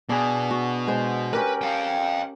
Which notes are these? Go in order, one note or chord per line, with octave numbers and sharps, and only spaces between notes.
B2 D4 G#4
F#4
G#3 C5
C#4 G4 A#4 B4
F5 G5